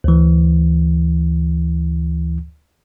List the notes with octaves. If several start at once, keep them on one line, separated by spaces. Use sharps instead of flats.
D2 E3